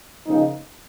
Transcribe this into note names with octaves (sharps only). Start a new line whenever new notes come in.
C#3 F3 A#3 D#4